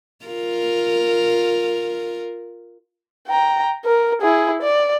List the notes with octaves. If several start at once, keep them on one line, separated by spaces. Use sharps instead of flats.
F4 A#4
G5 A#5
A#4
E4 G#4
D5